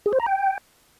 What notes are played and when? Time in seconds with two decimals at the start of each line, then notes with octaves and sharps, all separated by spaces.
0.06 G#4
0.13 C5
0.20 A#5
0.26 G5